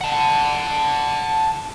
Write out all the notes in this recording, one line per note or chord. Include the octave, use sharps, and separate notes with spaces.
F#5 A5